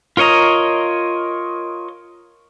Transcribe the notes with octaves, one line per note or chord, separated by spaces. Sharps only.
F4 A#4 C#5 D#5 A#5